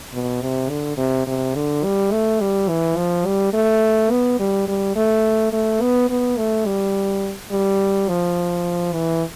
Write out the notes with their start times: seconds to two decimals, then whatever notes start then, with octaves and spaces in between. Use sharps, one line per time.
0.14 B2
0.42 C3
0.69 D3
0.98 C3
1.27 C3
1.55 D3
1.84 G3
2.12 A3
2.41 G3
2.69 E3
2.96 F3
3.26 G3
3.54 A3
4.11 B3
4.40 G3
4.68 G3
4.96 A3
5.53 A3
5.81 B3
6.10 B3
6.37 A3
6.66 G3
7.52 G3
8.09 F3
8.93 E3